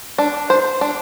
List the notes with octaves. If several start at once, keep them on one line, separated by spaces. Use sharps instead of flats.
D4
C5
D4